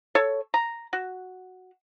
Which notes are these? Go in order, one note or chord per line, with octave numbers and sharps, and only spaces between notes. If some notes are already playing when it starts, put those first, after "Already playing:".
A4 C#5
A#5
F#4